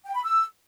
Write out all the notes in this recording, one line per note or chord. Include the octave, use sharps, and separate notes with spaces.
G5
B5
E6